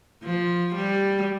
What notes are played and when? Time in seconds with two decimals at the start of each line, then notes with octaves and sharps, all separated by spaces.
0.23 F3
0.76 G3